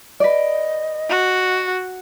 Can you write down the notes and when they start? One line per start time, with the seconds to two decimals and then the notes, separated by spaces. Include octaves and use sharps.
0.20 B4 D5 D#5
1.10 F#4